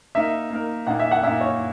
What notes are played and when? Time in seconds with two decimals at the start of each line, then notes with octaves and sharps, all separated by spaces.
0.15 A#3 D#4 A#4 E5
0.50 A#3 D#4 A#4
0.87 A#2 A#3 D#4 F#5
0.99 E5
1.11 F#5
1.23 A#2 A#3 D#4 E5
1.41 C#5